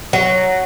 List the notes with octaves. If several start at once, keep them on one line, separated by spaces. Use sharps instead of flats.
F#3